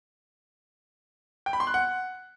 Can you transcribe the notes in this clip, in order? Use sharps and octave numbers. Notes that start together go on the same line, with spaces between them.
G5
B5
C6
F#6
F#5